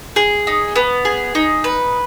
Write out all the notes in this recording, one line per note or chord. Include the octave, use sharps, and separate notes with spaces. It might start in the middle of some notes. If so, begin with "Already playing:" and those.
G#4
D#4
B3
G#4
D#4
B4